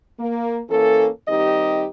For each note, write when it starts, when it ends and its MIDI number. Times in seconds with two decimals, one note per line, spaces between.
0.20 0.60 58
0.70 1.08 52
0.70 1.08 58
0.70 1.08 61
0.70 1.08 69
1.28 1.86 51
1.28 1.86 55
1.28 1.86 60
1.28 1.86 63
1.28 1.86 67
1.28 1.86 75